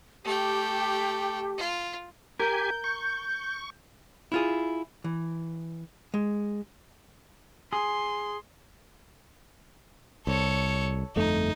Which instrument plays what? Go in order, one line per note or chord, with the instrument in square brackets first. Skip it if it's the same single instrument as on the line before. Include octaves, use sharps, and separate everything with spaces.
[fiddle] A3 G5 [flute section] G4
[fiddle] F4
[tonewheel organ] G4 G#5 [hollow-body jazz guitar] A#4 [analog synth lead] G6
[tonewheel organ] C#6
[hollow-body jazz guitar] E4 F4 G#4
E3
G#3
[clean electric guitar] G#4 [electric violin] C6
[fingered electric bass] C2 [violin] A4 C#5
[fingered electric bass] G1 F2 A3 [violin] D#4